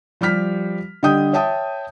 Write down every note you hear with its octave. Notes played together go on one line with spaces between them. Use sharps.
F3 G3 G4 F6 B6
D3 G3 D#5 G5 D#6 G6
C#5 E5 G5 A5 D#6